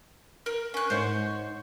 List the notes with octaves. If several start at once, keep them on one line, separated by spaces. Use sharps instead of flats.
A#4
C#4 F#6
G#2 C5 C#5